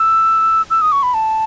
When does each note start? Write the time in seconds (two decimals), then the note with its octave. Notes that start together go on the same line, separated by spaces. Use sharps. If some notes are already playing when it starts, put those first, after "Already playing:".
Already playing: E6
0.70 E6
0.82 D#6
0.92 C#6
1.03 B5
1.14 A5